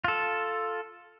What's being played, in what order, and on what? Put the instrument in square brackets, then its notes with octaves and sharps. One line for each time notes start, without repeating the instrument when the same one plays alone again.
[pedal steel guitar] F4 A4